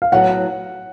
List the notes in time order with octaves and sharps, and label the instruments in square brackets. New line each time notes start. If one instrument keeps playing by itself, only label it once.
[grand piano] F5
[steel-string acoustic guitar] A2 F#3 B3 [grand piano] F#5